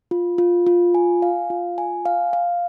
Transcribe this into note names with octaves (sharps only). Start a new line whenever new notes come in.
F4
F4
F4
G#5
F5
F4
G#5
F5
F5